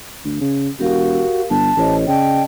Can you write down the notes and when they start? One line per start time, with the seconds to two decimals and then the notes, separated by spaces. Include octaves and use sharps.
0.25 D2
0.41 C#3
0.80 E1 F#4 G4 A#4 F5
1.50 G1 A5
1.77 A1 C5 C#5 D#5
2.08 C#3 D5 D#5 G5 A5